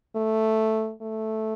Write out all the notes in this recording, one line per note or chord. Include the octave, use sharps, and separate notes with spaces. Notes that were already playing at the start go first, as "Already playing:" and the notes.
A3
A3